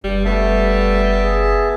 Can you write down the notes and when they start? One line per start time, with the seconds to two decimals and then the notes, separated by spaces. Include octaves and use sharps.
0.04 F#1 G2 G3
0.25 G3 A3 B3 E5 A5
1.24 G#4